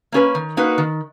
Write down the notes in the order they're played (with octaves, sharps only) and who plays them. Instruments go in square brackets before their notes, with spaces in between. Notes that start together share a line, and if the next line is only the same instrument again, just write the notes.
[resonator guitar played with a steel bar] A#3 C#4 G#4 B4
D#3
A#3 D#4 F#4 B4
D#3